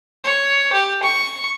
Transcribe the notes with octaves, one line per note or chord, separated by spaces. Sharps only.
C#5
G4
C#6